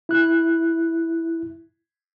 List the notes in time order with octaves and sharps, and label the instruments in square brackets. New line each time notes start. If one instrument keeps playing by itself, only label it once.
[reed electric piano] E4 F#6